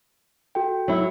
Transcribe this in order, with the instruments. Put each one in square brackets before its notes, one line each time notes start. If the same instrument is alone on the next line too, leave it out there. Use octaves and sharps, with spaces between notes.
[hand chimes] F#4 A4 G5
[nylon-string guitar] F#3 E4